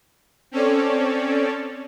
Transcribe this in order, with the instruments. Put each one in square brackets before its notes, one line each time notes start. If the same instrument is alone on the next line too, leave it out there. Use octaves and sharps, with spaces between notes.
[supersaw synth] C4 C#4 A4 C#5 D5